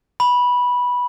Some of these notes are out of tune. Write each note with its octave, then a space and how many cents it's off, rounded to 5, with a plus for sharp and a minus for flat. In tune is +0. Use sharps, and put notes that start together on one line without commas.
B5 -10